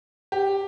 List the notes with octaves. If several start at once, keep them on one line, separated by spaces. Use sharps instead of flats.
G4